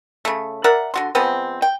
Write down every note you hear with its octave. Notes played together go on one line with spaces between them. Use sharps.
C#3 A3
A#4 D5 E5 F#5
D3 F#4 C6
F3 G#3 B3 C4
G5